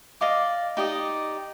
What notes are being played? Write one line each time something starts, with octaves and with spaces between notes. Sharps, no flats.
D5 D#5 F5 D6
D#4 G4 D5 D#5